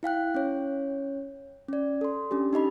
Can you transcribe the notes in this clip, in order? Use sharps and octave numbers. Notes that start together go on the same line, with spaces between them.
E4 F5 G5 F#6
C#4 C#5
C#4 D5
A4 C6
C#4 D4 G4
D#4 G4 D#5 B5